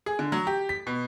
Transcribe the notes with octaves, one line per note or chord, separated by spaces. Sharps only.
G#4
D3
F#3
G4
B6
B2